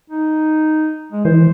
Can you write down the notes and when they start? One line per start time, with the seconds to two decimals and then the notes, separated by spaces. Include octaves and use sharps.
0.10 D#4
1.12 G#3
1.25 E3 C5